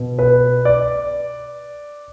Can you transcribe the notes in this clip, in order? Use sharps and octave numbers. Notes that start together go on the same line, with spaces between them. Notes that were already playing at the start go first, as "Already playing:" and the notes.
Already playing: B2
B4
D5